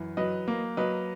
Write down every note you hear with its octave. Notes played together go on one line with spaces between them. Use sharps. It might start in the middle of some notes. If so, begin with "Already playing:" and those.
Already playing: F#2 E3
F#3 B4 D#5
A#3
F#3 B4 D#5